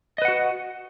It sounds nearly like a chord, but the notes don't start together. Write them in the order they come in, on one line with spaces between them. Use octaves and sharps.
D#5 B4 F#5 F#4